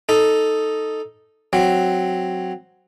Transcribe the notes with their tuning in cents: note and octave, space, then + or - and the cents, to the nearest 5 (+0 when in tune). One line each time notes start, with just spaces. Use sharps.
D#4 +0 A4 +0
F#3 +0 C4 +0